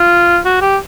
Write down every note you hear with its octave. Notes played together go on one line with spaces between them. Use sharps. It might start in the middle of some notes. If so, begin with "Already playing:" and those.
Already playing: F4
F#4
G4